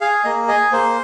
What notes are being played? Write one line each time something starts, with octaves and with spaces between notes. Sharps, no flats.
G#4 F5
A#3 D#5
G#4 D#5
A#3 C5